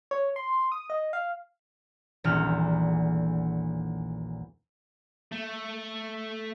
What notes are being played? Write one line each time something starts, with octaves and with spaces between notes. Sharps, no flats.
C#5
C6
D#6
D#5
F5
D#1 A#1 E2 A3 E6 F6
A3